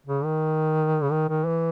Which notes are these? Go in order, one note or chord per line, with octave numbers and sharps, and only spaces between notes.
C#3
D#3
C#3
D#3
D#3
E3